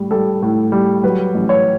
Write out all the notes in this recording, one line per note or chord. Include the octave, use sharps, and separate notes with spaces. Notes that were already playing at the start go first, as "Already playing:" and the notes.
Already playing: A2 G3
G3 A4
A2
G3
F#3 B4
A1
C#5